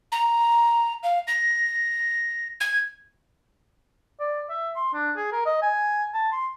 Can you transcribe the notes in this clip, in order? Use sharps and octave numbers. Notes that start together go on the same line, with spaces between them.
A#5
F5
A#6
G#6
D5
E5
C6
D4
G#4
A#4
D#5
G#5
A5
C6